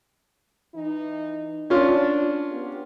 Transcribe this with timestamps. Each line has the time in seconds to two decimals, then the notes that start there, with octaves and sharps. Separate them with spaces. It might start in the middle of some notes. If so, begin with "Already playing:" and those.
0.75 E3 D#4
1.70 C#4 D4 F4
2.52 B3 G4